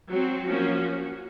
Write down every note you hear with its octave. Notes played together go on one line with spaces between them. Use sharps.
F#3 C4 F#4
F3 A#3 C#4